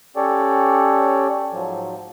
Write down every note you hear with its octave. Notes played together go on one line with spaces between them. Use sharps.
C#4 G4 A4 C#5 D5
G#2 F3 F#3